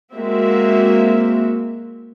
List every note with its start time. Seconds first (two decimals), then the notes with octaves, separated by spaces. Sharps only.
0.14 G#3 A#3 C4 F#4 E5